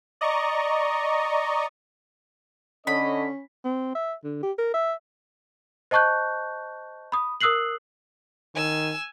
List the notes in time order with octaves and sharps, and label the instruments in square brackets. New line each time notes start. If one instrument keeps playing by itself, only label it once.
[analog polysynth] D5 D#5 A#5 C#6
[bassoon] D3 [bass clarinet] C#4 [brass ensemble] A4 C#5 D#5 [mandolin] B5
[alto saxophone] C4
E5
D3
G4
A#4
E5
[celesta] C5 D#5 A5 C#6 F#6 G6
B5 D#6
A#4 D#6 E6 F#6 C7 F#7
[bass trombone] D#3 [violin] G#5 E6